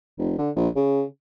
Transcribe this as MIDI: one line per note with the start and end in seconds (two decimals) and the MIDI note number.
0.18 0.35 29
0.38 0.50 50
0.56 0.68 34
0.76 1.03 49